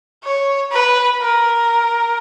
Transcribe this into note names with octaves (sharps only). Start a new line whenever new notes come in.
C#5
B4
A#4